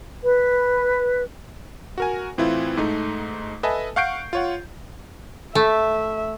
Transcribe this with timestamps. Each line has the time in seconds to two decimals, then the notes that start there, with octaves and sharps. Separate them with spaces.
0.22 B4
1.98 F#4 A#4 G#5
2.38 A2 E3 C4 E4 F4
2.77 G#2 A3 D#4
3.63 A4 B4 D#5 E5 G#5 A5
3.96 F5 F#5 C#6 G6 C7 D7
4.33 F4 C#5 F#5
5.55 A3 E5